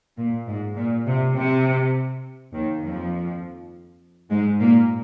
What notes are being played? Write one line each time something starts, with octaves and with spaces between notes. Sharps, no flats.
A#2
G#2
A#2
C3
C3
D#2 D#3
F2 F3
G#2 G#3
A#2 A#3